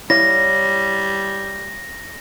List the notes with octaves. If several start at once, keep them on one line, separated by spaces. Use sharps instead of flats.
G3 E4 C#5 F5 A#6